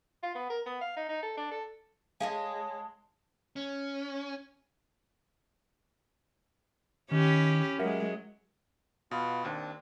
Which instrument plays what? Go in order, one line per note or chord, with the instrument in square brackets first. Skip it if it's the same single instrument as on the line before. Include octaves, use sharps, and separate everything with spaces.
[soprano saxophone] F4
B3
A#4
B3
F5
D#4
D#4
A4
D4
A4
[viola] G#3 [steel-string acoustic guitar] G#4 C#5 D#5 [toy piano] F5 G#5 [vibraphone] A5
[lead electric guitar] C#4
[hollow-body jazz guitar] D#3 [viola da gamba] C#4 E4 G4
[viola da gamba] F#3 G#3 [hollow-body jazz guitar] A#4 E5 F#5
[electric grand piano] B2 [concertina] B3 F4
[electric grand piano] D#2 [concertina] C4 D4